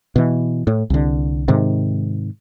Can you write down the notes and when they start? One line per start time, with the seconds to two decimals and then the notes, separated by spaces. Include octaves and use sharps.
0.16 B2 E3
0.67 A2
0.90 C2 D3
1.48 G#2 C3 D#3